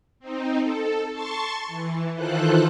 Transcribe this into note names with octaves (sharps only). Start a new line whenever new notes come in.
C4 D#4
A4
A5 C6 C#6 A6
E3
D#3 E3 F4 A4 C5 F#6